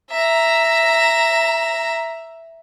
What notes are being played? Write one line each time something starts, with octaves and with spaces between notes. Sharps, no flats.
E5 A#5